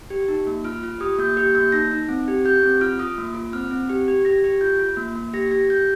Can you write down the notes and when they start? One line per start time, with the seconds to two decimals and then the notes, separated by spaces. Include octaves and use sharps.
0.10 G4
0.28 D#4
0.47 A#3
0.64 F4 F6
0.83 F4
1.00 G4 D#6
1.19 A#3 G6
1.37 G4 G6
1.55 A#3 G6
1.72 D#4 A#6
1.91 D#4
2.09 C4
2.28 G4
2.45 G4 G6
2.63 C4
2.81 F4 F6
2.99 F4 D#6
3.18 A#3
3.35 F4
3.53 C4 F6
3.71 C4
3.90 G4
4.08 G4
4.25 G4 A#6
4.44 G4
4.61 F4 G6
4.79 F4
4.97 A#3
5.16 A#3
5.33 G4 A#6
5.51 G4 A#6
5.69 G4 G6